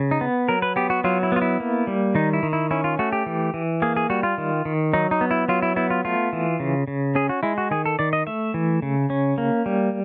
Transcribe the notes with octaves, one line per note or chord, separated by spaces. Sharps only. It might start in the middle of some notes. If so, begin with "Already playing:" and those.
Already playing: C#3
D#4
B3
F#3 A#4
B4
B3 G4
F#4
F#3 F4
E4
B3 F4
E4
A#3
G3
D#3 D#4
E4
D#3
E4
C#4 E4
F4
A3 F#4
G4
E3
E3
A#3 G#4
G#4
G3 F#4
F4
D#3
D#3
F#3 D#4
D#4
B3
E4
F#3 F4
E4
B3 E4
F4
A3 F4
E3
C#3
C#3
C#4 G#4
F#4
G#3 E4
F#4
D#3 G#4
A4
D#3 D5
D#5
A3 E5
E3
C#3
C#4
A#3
G3